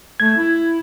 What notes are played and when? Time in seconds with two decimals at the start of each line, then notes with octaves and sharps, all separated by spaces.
0.20 A3 G#6
0.36 E4